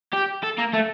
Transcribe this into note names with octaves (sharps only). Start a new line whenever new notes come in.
G4
A4
A#3
A3